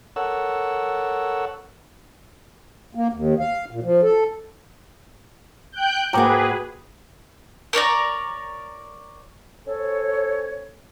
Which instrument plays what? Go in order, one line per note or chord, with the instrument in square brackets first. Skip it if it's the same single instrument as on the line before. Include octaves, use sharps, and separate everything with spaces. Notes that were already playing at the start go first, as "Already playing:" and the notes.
[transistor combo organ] A4 A#4 C#5 F#5 E6
[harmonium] A#3
D#2
F5
A#2
F3
A4
[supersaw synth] G5 F#6 G6
[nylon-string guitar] G#2 A#3 F#4 [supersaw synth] G#4 B4 [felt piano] G5 A#5 D6
[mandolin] A#4 C#5 D5 A#5
[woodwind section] C#4 A4 C5 C#5